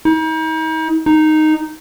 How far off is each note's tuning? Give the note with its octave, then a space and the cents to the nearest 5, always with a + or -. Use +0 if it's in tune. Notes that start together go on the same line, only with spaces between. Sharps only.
D#4 +40
D#4 -5